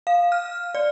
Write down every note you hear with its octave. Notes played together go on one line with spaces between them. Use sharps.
F5
F6
D5